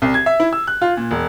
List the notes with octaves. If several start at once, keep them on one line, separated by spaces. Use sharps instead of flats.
C2
G#6
E5
E4
E6
F#6
F4
A#2
E1